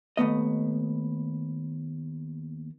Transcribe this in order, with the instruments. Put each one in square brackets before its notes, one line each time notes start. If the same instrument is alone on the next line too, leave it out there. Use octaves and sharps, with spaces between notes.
[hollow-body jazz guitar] D#2 A3 B3 D#5